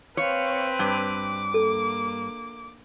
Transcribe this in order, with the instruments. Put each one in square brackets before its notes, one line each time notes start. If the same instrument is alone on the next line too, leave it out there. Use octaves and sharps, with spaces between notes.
[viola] C4 B4 [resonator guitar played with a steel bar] C#5 [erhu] F5
[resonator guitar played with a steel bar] G2 [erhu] D6
[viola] A#3 [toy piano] A4